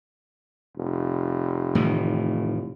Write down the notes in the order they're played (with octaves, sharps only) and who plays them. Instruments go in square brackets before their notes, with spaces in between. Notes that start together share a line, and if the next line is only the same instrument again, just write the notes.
[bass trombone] F1
[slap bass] A2 D#3 E3